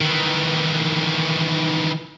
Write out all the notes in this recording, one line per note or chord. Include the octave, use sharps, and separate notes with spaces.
D#3 E3